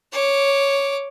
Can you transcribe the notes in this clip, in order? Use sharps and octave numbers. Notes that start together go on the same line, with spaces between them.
C#5 D6